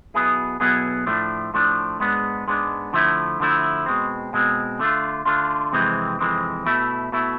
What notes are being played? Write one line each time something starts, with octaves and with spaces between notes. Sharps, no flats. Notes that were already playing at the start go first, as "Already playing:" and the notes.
B1 B2 B3 E4 G#4
B1 B2 B3 E4 G#4
A2 F3 A3 D4
A2 F3 A3 D4
G#2 G#3 B3 D4
G#2 G#3 B3 D4
D3 F3 A3 E4
D3 F3 A3 E4
B2 G#3 C4
B2 G#3 C4
D3 A3 D4 F4
D3 A3 D4 F4
F2 C3 E3 G#3 C4
F2 C3 E3 G#3 C4
B2 A3 E4
B2 A3 E4